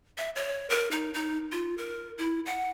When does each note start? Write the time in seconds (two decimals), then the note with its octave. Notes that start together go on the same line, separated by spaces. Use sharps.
0.18 E5
0.36 C#5
0.70 A#4
0.91 D#4
1.14 D#4
1.52 F4
1.78 A#4
2.18 E4
2.46 F#5